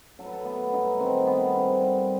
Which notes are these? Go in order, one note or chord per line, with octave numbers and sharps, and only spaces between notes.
F#3 A4
B4
A4
A3 B3
G2 D#4
D#3 C4
G3 B3
G2 C4
G3